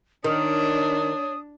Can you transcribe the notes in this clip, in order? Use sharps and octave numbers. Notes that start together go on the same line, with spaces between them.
D#3 D4 C#5 D#6